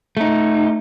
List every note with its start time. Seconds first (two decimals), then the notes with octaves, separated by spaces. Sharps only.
0.17 A3 D#4